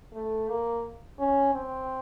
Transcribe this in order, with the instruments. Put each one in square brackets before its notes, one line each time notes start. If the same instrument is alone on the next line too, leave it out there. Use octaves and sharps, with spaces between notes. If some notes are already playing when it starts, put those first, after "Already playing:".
[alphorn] A3
A#3
C#4
C4